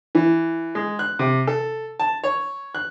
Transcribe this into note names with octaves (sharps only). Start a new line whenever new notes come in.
E3
G#3
F#6
C3
A4
A5
C#5
F#6